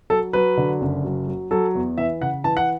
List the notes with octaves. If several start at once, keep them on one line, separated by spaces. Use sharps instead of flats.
F#3 A4
F#3 B4
D3
F#1
F#3
F#3
F#3 A4
E2
E3 E5
C#3 F#5
E3 A5
F#5